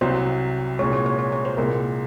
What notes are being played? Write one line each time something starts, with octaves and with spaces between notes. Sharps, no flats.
C2 C3 F#3 C5
C2 A#2 G#3 C#5
C#5
C#5
C#5
C#5
C5
C2 A#2 G#3 A#4